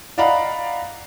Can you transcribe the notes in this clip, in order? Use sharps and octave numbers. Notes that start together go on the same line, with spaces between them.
D5 D#5 F5 F#5 A#5 B5